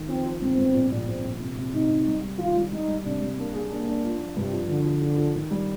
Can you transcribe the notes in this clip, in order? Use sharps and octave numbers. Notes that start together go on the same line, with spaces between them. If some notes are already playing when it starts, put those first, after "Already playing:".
Already playing: D#3
F3 C4
F3
G1 C4
G1
A#1
A#1
A#1 C4
A#1
C3
C3
C3 D#4
C3
G3
G3
D#3 F4
G3
G3 D#4
G3
C3 D4
G3
A#3 D4
G#4
A#3 D4
D4
F4
F3
G2 C3
F3
D3 F3
F3
F3
F3
D#3
G3